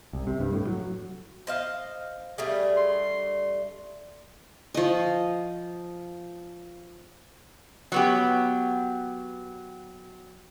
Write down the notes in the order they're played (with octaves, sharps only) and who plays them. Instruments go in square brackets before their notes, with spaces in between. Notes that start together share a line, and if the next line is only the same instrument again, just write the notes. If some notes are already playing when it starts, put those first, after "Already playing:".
[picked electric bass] C2
C3
G2
A2
F#3
[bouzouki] C5 D#5 F5
[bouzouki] G3 A3 D4 [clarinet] G#4
[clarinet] C6
[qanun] F3 D#5
[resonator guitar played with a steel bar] F#3 B3 G4